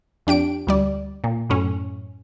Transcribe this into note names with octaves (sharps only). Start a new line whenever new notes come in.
F2 D4 G4 D7
D2 G3 D5
A#2
F#2 A2 C#4